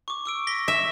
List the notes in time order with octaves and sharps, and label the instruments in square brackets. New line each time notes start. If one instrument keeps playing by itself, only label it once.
[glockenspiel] C#6 D6
C#6 E6 D7
A#6 B6 G7
[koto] E5